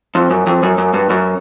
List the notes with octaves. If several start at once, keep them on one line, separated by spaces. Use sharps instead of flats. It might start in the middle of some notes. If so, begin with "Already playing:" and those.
F2
F#2
F2
F#2
F#2
G2
F#2